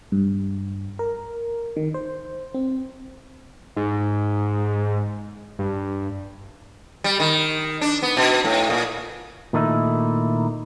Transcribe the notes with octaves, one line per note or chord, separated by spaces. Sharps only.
G2
A#4
D#3
C5
C4
G#2
G2
G3
D#3
D4
B3
B2
A2
A#2
A#2 D#3 A3 D#4 E4